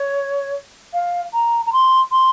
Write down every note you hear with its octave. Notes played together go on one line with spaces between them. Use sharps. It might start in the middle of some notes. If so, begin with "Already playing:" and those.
Already playing: C#5
F5
A#5
A#5
C6
C6